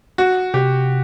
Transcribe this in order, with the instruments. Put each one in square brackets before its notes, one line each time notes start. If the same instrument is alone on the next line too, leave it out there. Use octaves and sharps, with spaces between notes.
[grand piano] F#4
[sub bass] C3 [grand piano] G4